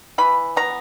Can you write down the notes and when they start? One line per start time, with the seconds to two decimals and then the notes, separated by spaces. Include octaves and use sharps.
0.18 E3 B5
0.56 B3 A#5